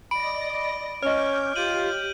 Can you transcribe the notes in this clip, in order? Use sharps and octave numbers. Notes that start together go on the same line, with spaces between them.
D5 D#5 B5 A#6 D7
C#4 C#5 D#5 D6 F6 G6
F4 G4 G6 D#7 F#7